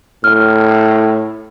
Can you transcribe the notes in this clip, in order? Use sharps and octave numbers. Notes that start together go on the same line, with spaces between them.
A2 F6